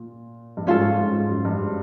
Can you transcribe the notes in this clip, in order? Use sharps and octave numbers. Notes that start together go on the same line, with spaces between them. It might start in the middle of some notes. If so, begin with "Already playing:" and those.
Already playing: A#2
G2
G#2 C#4 F4 A4
G#2
F#2
G2